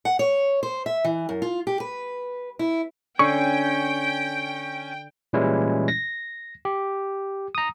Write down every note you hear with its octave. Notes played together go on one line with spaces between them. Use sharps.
F#5
C#5
C5
E5
E3
F#2
F4
G4
B4
E4
D3 C#4 G5 C#6
A#2 E3 G3 G#3 C#4 E4
A#6
G4
A#5 D#6